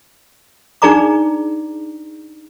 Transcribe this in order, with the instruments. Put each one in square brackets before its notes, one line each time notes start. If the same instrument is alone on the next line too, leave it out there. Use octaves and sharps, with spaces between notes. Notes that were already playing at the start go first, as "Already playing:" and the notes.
[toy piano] D4 D#4 G#4 D5 A#5 D6